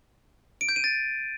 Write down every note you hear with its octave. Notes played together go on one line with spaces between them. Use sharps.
D7
G6
D#7
A6